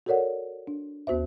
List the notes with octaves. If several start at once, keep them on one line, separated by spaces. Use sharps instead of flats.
F#4 A4 A#4 C#5 D5 F#5
D4
D#2 B3 F#4 C5 E5